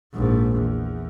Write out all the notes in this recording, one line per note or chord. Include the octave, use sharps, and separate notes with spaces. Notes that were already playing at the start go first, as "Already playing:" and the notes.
A#1 G#2
E2